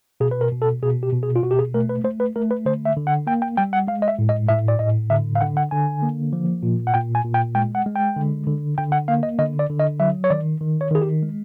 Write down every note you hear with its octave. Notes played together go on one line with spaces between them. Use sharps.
B2 G#4
B4
A#4
B2
A4
B2 G#4
G4
B2
G#4
F4
B2 F#4
G4
G#4
A3 A#4
B4
A3 C5
B4
A3 A#4
B4
D3 C5
E5
D3
F#5
A#3 G5
G5
G3 G5
F#5
G#3 F5
D#5
E5
A2
D#5
A2 E5
D5
A2 D#5
D3 E5
F5
D3 F#5
F#5
D3 G#5
A#3
F3
A#2
F#5
A#2 G5
G#5
A#2
G5
G#3 G5
F#5
G#3
G5
D3
D3
D3 G5
F#5
A#3 F5
D#5
D3 D#5
D5
D3
D#5
F#3 E5
C#5
D#3 D5
D#3
C#5
D#3 G#4
G4
G#3